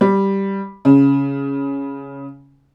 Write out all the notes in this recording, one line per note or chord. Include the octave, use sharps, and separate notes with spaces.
G3
C#3